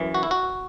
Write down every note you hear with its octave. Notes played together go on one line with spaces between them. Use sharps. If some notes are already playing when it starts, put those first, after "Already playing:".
Already playing: F#2 E3
F#4
E4
F#4